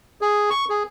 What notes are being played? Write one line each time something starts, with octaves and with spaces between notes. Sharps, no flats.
G#4
C#6
G#4